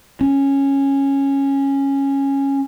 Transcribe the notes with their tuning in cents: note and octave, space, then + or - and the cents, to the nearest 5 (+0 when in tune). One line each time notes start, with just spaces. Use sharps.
C#4 -10